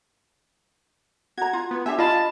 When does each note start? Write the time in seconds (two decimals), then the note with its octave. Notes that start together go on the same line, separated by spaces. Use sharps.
1.38 F#4 A#5 G#6
1.53 F4
1.71 B3
1.86 D4 G4 E5 G#5
1.99 F4 D#5 A5 B5